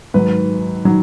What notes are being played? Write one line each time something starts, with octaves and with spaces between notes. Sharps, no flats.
G#2 D#3 F#3 B4
D#3 F#3